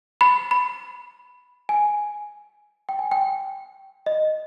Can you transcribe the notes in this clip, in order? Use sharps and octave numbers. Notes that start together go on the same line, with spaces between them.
B5
B5
G#5
G5
G#5
G5
D#5